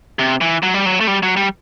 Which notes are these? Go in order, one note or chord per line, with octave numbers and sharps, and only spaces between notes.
C3
E3
F#3
G3
F#3
A3
G3
F#3
G3